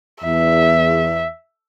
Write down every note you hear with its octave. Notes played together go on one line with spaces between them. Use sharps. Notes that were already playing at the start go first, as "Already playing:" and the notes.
E2 E5